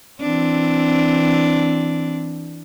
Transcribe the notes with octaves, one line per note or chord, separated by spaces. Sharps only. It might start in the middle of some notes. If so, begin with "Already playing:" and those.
E3 C4 D4